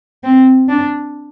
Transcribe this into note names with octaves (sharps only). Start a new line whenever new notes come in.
C4
D4